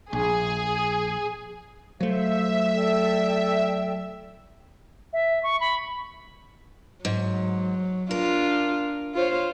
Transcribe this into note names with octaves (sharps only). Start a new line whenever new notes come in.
A#1 G#4
F#3 A3 C5 E5 F5
A4 D5 G5
E5
C#6
B5
G#2 F#3
D4 F4 A#4
F4 C5 C#5